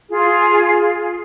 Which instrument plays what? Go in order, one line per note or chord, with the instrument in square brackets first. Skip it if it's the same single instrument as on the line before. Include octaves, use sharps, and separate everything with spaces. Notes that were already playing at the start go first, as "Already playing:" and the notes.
[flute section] F4 G#4